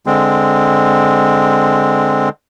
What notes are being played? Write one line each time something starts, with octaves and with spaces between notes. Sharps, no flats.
D3 G#3 C4